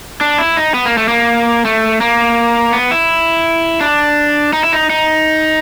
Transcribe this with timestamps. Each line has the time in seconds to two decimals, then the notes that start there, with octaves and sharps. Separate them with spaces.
0.21 D4
0.39 E4
0.57 D#4
0.74 B3
0.86 A#3
0.98 A3
1.08 A#3
1.65 A3
2.01 A#3
2.73 B3
2.91 E4
3.81 D4
4.53 D#4
4.63 E4
4.73 D#4
4.90 D#4